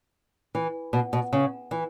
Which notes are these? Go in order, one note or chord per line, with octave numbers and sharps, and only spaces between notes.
E3
B2
B2
C#3
E3